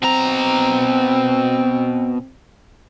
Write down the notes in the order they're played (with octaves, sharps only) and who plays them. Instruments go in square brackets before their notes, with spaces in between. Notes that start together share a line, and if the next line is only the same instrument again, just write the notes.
[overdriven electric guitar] B2 A#5 [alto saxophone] C4